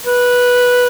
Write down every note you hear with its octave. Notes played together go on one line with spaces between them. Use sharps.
B4